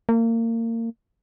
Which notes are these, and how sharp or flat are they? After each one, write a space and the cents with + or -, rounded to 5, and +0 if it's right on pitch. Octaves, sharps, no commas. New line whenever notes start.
A#3 -30